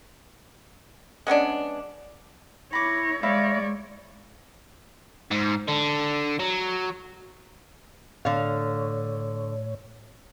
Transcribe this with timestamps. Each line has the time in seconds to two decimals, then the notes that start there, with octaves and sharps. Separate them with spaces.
1.27 G#3 B3 C#4 D4
2.73 E4 C#5 B5 D6 A#6
3.23 G#3 C#5 D5 E5 F5 B5 A#6
5.31 G#2
5.68 D3
6.39 F#3
8.25 A2 D3 C#5 F5